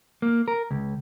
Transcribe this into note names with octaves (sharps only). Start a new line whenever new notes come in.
A#3
A#4
C#2